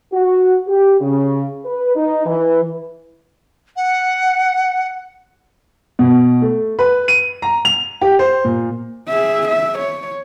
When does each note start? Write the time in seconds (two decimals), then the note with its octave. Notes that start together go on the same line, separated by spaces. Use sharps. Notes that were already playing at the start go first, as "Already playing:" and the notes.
0.13 F#4
0.68 G4
1.01 C#3
1.65 B4
1.96 D#4
2.26 E3
3.76 F#5
5.99 B2
6.42 A3
6.79 B4
7.08 D#7
7.42 A#5
7.65 F7
8.01 G4
8.19 C5
8.44 A#2
9.08 G#4 E5
9.48 E5
9.79 C#5